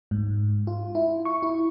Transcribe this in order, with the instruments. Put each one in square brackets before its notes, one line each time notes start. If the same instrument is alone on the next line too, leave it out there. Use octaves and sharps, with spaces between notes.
[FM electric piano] G#2
F4
E4
C#6
E4